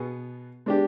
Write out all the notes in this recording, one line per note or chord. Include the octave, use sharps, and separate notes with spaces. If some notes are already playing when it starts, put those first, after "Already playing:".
Already playing: B2 B3 G#4
G#3 D4 G4